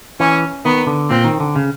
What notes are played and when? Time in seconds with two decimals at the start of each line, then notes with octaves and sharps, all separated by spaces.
0.20 E3 C#4
0.65 D#3 B3
0.87 D3
1.10 A#2 C4
1.24 D#3
1.40 D3
1.56 C#3